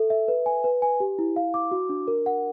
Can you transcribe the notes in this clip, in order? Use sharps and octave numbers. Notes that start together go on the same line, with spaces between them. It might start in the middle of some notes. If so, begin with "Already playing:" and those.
Already playing: A4 E5
E5
B4
G#5
B4
G#5
G4
E4
F5
D6
F#4
D4
A#4
F#5